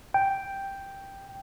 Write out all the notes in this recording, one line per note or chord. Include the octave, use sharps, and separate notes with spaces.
G5